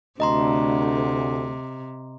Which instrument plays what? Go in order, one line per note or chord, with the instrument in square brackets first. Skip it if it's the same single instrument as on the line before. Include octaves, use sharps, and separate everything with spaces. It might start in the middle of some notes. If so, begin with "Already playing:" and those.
[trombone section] D2 [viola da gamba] C3 [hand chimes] D#5 A#5 C6